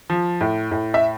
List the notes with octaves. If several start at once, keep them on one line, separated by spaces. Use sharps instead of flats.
F3
A2
A2
E5